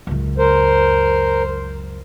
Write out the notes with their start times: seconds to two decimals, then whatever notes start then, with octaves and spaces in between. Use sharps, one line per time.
0.07 C#2 F#2
0.38 A#4 C5